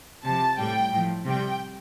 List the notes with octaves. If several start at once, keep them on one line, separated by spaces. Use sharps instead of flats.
C3 F3 A5
A2 G3 G5
A2 F3
C3 G3 G5